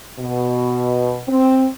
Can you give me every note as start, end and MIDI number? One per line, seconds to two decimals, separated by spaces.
0.19 1.22 47
1.28 1.66 60